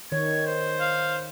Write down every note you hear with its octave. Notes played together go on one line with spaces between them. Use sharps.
D#3 C#5 G#6
C5
F5